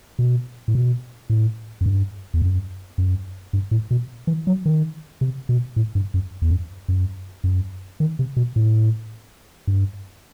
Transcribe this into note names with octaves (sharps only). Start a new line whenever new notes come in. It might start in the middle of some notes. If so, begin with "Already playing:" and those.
B2
A2
B2
A2
F#2
G2
E2
F#2
F#2
G2
A2
B2
E3
F#3
D#3
C3
B2
A2
G2
F#2
E2
F#2
F#2
F#2
D#3
C3
B2
A2
G2